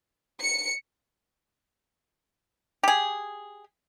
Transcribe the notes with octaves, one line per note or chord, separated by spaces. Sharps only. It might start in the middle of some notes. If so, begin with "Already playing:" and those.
C#7
G4 G#4